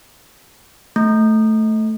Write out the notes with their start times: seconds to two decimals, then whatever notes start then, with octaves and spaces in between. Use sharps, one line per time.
0.96 A3